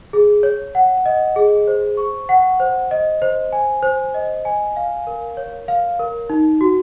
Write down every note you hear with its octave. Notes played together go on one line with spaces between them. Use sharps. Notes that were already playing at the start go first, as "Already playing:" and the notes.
G#4
C#5
F#5
D#5
G#4
C5
C#6
F#5
C5
D#5
C5
G#5
C5
D#5
G#5
F5
A#4
C#5
F5
A#4
D#4
F#4